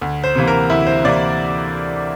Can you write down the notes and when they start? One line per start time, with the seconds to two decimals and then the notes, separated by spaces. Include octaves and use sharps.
0.01 D2
0.24 C5
0.36 C3 E3 A#3
0.48 A#4
0.70 D2 E4
0.87 C5
1.04 C3 E3 A#3 D5